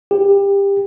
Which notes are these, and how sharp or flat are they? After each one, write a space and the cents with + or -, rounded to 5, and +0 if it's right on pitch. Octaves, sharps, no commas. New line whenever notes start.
G4 +25